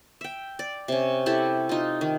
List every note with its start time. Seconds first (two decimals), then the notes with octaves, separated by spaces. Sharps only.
0.21 E5 G5
0.59 D5
0.88 C3 C#4
1.26 E4 G4 A4 A5
1.69 D#4 F4
2.01 D#3